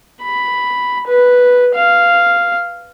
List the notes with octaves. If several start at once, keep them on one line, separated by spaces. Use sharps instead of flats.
B5
B4
F5